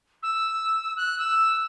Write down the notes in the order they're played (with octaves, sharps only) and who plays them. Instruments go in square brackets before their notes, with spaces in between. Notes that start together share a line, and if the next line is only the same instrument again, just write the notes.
[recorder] E6
F#6
E6